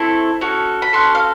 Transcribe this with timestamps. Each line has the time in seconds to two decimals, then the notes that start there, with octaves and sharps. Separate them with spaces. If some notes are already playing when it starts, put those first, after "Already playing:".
Already playing: A3 C4 E4 A4
0.41 C#4 F#4 A4
0.82 B5
0.93 C#4 F#4 A4 C6
1.15 F5